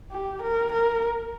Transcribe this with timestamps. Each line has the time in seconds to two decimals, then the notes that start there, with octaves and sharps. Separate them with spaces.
0.11 G4
0.42 A#4
0.72 A#4